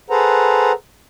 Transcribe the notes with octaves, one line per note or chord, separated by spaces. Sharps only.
G#4 A4 B4 C5 F#5 A#5